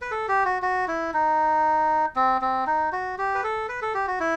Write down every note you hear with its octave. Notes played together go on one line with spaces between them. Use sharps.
B4
A4
G4
F#4
F#4
E4
D#4
C4
C4
D#4
F#4
G4
B4
A4
B4
A4
G4
F#4
E4